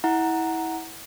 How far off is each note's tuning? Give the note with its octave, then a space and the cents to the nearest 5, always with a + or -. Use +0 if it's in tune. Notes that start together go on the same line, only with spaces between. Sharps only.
E4 -25 F#5 +0 A#5 +0